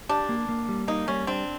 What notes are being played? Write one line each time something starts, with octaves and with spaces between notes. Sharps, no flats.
D4 G4
A#3
A#3
G3
A#3 D#4
G3 C#4
C4 D4